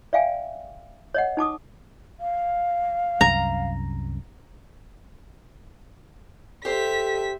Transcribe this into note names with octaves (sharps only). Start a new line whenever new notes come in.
D5 E5 F5 G5 G#5
C#5 D#5 F#5
D#4 A5 D6 D#6
F5
C2 F#2 A#5
G4 A4 C5 E5 B6